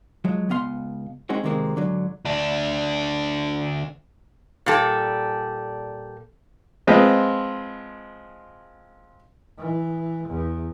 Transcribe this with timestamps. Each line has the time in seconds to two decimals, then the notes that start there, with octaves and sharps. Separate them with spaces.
0.24 F3 F#3 G#3
0.49 C#2 B3 F5 C6
1.29 G#3 C4 C#4 D#4 F#4
1.43 D#2 C3 D#3 G#3 A#3 C4
1.76 G#2 D3 F#3
2.25 D2 D4
4.66 A#2 G3 A4
6.87 F3 G#3 C4 B4 D#5
9.58 E3
10.28 E2